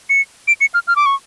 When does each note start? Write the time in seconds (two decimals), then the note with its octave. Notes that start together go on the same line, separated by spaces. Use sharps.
0.10 C#7
0.48 D7
0.61 C#7
0.74 F6
0.88 F6
0.96 D6
1.06 C#6